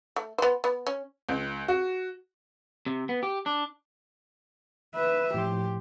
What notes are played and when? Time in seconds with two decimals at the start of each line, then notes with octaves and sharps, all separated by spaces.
0.16 A3
0.38 B3 C5
0.64 B3
0.87 C#4
1.29 C#2
1.68 F#4
2.86 C3
3.09 B3
3.23 G4
3.46 D4
4.95 B4 E5
5.34 A2 F3 G4 C6